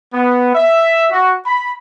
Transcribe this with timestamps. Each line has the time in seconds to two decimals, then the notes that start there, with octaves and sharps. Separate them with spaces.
0.14 B3
0.55 E5
1.11 F#4
1.46 B5